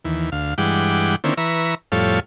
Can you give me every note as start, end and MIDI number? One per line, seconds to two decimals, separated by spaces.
0.05 0.30 39
0.05 0.30 52
0.32 0.54 38
0.32 0.54 77
0.58 1.16 43
0.58 1.16 52
0.58 1.16 56
0.58 1.16 78
0.58 1.16 79
0.58 1.16 86
1.24 1.34 50
1.24 1.34 51
1.24 1.34 58
1.24 1.34 60
1.24 1.34 61
1.24 1.34 64
1.37 1.75 52
1.37 1.75 71
1.37 1.75 76
1.37 1.75 82
1.37 1.75 85
1.92 2.20 41
1.92 2.20 45
1.92 2.20 55
1.92 2.20 69
1.92 2.20 73
1.92 2.20 77